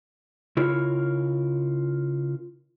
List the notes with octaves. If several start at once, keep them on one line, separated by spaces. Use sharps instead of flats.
C#3 E4 F4 A#4 C#5